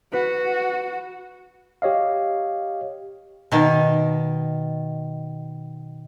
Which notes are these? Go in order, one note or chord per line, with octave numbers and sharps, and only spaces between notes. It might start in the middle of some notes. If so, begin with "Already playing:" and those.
F#4 B4
G4 C#5 D#5 F5
B2 D#3